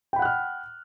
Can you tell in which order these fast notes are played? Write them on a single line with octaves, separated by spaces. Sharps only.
G5 B5 F#5 F#6 F6